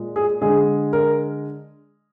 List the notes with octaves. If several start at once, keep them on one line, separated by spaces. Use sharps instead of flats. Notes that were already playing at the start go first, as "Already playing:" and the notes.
Already playing: A#2 G#3
G#4
D3 G#3 G#4
A#4